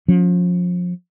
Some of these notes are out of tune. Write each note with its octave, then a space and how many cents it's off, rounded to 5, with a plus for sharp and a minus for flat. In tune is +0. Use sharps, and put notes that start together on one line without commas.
F3 +30 C#4 +0